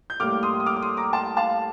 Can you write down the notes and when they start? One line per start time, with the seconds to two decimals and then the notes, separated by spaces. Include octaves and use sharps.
0.10 G6
0.20 A2 G3 A#3 D6 F6
0.43 C6 D#6
0.60 D#6
0.66 D6 F6
0.76 D6
0.82 C6 D#6
0.97 A#5 D6
1.13 A5 C6
1.37 F5 A5